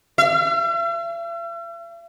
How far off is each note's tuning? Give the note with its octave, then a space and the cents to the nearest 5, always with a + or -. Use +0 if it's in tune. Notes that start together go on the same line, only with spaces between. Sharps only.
E5 +45